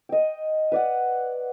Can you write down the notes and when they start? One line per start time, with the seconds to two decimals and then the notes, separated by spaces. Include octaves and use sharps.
0.09 D#5 G5
0.72 B4 D5 F#5